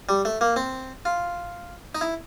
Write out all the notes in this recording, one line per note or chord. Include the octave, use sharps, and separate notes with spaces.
G3
A3
A#3
C4
F4
D#4
E4